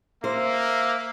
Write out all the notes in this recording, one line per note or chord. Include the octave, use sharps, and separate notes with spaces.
A#3 C5 E5